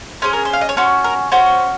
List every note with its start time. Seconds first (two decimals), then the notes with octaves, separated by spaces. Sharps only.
0.22 C#4 G#4 C5
0.33 A#4
0.45 C5
0.53 F5
0.61 D#5
0.69 C#5
0.77 C#4 F#4 C5
1.04 A#4
1.32 C#4 F#4 C5